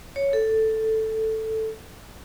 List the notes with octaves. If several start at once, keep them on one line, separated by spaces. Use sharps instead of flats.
C#5
A4